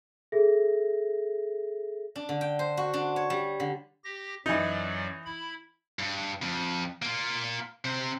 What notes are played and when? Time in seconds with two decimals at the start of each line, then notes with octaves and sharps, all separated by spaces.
0.32 G#4 A4 E5 A#6
2.16 D4
2.29 D3
2.41 G5
2.59 C5
2.77 F#4
2.93 D4
3.16 C#5
3.30 G3
3.60 D3
4.04 G4 A#6
4.46 F#2 E3 F#3 D#4 D5
5.25 E4 B5
5.99 G2
6.42 F2
7.02 A#3 F4
7.85 C3 C5